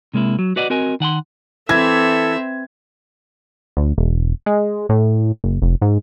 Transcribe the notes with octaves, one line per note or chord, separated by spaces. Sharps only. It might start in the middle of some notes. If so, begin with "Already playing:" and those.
C3 G#3 A#3 E4
F#3
F#4 B4 D5 D#5 F#5
C4 F#4 A#4 D#5 G#5
D#3 F#5 G#5 C6
E3 C4 A4 E5 G#6
D2
E1
G#3
A2
F#1
F1
G#2